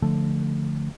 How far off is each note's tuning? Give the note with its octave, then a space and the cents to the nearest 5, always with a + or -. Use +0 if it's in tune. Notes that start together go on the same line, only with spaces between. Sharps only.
D3 +0 F3 +0 A3 +0